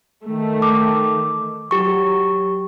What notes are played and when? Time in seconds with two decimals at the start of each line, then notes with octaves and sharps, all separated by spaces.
0.25 D#3 A3
0.62 D6
1.71 F#3 G4 C#6